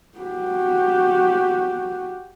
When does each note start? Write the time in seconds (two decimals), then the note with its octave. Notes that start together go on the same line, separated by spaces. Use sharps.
0.18 F#4 G4